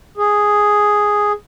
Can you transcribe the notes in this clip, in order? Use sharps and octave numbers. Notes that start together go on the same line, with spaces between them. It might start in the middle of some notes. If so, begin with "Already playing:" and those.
G#4